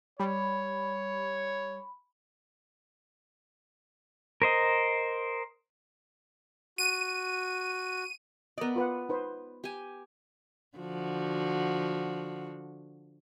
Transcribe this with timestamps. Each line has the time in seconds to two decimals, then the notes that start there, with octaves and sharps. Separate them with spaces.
0.20 G3 C#5 B5
4.42 A#4 C5 D#5
6.78 F#4 D#7
8.58 B3 A#4 D5 D#5
8.76 F4 B4 F#5
9.09 D#4 B4 C5
9.64 G4 G#5
10.77 D3 F3 F#4